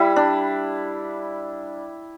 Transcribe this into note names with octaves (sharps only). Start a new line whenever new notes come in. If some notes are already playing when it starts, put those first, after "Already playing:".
Already playing: G3 E4
D4